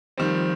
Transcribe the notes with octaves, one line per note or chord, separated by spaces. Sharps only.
D#3 F3 G3 C4